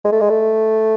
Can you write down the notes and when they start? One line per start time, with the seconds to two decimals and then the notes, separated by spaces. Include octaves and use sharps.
0.04 G#3
0.12 A3
0.21 G#3
0.30 A3